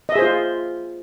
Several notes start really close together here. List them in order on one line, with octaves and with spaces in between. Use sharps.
D#5 E5 G#4 C5 F4